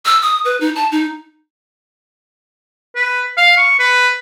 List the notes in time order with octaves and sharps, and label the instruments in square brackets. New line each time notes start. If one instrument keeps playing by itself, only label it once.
[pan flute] E6
D#6
B4
D#4
A5
D#4
[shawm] B4
F5
C#6
B4